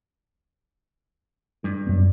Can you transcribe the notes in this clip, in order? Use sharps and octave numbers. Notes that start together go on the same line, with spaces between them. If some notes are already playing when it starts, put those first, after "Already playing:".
G2
F#2 B3